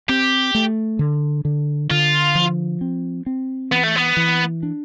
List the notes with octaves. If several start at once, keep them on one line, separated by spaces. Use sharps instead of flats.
C4 G4
A3
D3
D3
D3 F4
F3
C4
C4
E3 B3
A3
B3
E3
D4